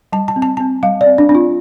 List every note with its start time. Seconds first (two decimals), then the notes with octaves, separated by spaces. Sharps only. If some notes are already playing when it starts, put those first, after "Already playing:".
0.12 G3 A5
0.28 A5
0.36 C4
0.42 A5
0.57 C4 A5
0.83 G3 F5
1.01 D5
1.06 C4
1.18 D4
1.29 C4 D4
1.35 F4